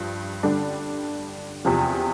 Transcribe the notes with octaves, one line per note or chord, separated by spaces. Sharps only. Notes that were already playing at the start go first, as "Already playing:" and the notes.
Already playing: G2 F3
D3 G3 D4
E2 C3 F3